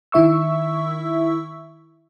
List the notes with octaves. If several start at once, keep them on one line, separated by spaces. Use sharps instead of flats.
D#3 E4 E5 C#6 E6